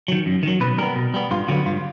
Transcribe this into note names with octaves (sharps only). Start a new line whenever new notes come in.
D#3 F#3
F#2
D#3 F#3
B2 B4
G3 B3 A#4
B2
G3 B3
G2 F4
D3 F#3 B3 F#4
G2 F4